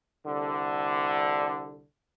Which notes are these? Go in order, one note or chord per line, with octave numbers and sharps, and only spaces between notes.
C2 D3